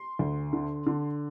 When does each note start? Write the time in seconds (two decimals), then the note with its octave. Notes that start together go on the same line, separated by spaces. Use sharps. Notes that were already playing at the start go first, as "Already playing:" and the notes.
Already playing: C6
0.19 D2
0.53 D3
0.87 D3